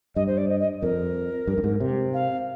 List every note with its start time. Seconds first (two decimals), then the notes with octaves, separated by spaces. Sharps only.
0.16 G2 D#5
0.27 C5
0.38 D5
0.49 D#5
0.60 D#5
0.82 F2 A#4
1.47 G2
1.58 G2
1.64 G#2
1.80 C3
2.14 F5